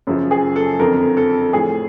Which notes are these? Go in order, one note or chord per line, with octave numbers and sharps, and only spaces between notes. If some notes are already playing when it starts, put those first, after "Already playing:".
F#2 C#3 F3
G#4
A4
F2 D3 F3 A#4
A4
A2 F3 G#4